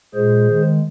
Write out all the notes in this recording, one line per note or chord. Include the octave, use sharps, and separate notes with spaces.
A#2 G#3 G#4 C5
D#3 G#3